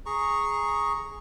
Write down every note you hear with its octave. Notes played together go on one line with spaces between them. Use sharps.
G#4 A#5 C#6